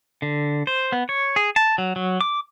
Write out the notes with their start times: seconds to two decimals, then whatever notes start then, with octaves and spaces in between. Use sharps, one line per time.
0.22 D3
0.67 C5
0.92 B3
1.09 C#5
1.36 G#4
1.56 A5
1.78 F#3
1.96 F#3
2.21 D6